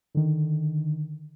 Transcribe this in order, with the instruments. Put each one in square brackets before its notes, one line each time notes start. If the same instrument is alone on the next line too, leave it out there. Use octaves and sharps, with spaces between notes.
[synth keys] D3 D#3